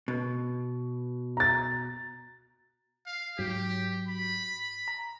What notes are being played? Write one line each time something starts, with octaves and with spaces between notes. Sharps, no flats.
B2
A#5 A6
F5
G#2 F#3 G4 B6
B5
A#5